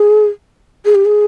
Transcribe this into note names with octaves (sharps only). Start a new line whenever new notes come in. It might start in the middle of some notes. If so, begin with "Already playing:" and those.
Already playing: G#4
G#4
G4
G#4